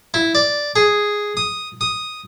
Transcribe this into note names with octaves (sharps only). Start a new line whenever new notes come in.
E4
D5
G#4
D#6
D#6